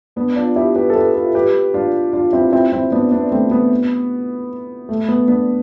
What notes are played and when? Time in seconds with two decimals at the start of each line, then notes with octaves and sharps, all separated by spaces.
0.16 B3 D4
0.36 D4 F4
0.56 E4 G4
0.76 G4 B4
0.90 A4
0.95 G4 B4
1.15 F4 A4
1.34 G4 B4
1.74 D4 F4
2.13 D4 F4
2.33 C4 E4
2.53 C4 E4
2.72 C4 E4
2.92 B3 D4
3.12 B3 D4
3.32 A3 C4
3.51 B3
4.89 A3
5.09 B3
5.28 B3 D4